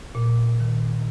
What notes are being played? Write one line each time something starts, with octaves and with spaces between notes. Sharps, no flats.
A#2
D#3